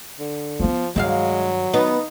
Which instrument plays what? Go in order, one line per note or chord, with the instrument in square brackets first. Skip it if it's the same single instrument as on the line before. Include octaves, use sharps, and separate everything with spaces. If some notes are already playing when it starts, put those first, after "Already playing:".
[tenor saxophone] D3
[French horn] F3 [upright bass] B3 C4
[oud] G2 E5 F5 [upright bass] D#3 [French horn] F#3 [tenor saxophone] G#3
[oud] B3 [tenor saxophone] D#4